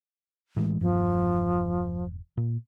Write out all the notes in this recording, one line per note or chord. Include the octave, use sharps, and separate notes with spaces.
A2 E3 G#3
E1 G2 F3
A#2